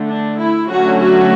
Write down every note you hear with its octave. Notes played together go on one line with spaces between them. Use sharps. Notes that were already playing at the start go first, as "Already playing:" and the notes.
Already playing: D3 A3
D4
E4
D3 F#3 A3 C#4 F#4
F#4